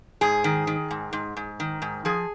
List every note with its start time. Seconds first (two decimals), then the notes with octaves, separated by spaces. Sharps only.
0.21 G#2 G#4
0.44 D#3
0.67 D#3
0.91 G#2
1.13 G#2
1.37 G#2
1.60 D#3
1.82 G#2
2.05 F3 G#4